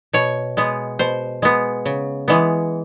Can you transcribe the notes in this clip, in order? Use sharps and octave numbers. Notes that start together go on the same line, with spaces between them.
B2 C#5
G#3 B3
B2 C5
G#3 B3
C#3
E3 G#3 B3